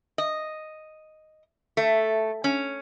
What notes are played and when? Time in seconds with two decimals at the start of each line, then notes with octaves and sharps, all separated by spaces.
0.18 D#5
1.77 A3
2.44 C#4